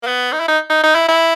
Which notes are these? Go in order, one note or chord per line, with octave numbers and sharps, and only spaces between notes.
A#3
B3
D#4
E4
D#4
D#4
D#4
E4
E4